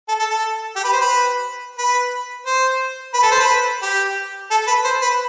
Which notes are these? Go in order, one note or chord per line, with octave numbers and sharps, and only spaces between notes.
A4
A4
A4
G4
B4
C5
B4
B4
C5
B4
A4
C5
B4
G4
A4
B4
C5
B4